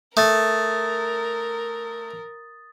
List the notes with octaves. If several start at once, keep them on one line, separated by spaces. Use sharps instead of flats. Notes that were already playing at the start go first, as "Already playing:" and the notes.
A3 A#4 D#6 A6